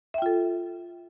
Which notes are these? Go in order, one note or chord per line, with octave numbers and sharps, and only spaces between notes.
F4 A4 E5 G5